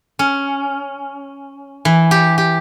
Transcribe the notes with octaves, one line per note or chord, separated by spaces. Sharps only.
C#4
E3
G4
G4